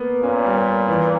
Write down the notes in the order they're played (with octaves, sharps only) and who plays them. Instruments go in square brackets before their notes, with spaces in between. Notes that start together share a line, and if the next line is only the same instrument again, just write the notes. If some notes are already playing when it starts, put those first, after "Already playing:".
Already playing: [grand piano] A#3 B3
[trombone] A#2 [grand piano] C#4
[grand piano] G3
A#3
E3